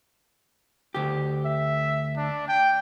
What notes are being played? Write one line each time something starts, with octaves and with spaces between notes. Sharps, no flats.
D2 G4
E5
D4
G5